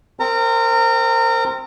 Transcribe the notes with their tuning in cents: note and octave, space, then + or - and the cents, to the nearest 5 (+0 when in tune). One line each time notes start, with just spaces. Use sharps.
C4 +0 A#4 -25 A#5 -30